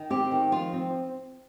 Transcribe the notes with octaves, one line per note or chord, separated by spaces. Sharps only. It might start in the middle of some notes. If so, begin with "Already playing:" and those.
Already playing: D#3
C4 G4
D#3
F3 F4
C4